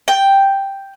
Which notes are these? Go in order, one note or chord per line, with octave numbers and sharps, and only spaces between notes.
G5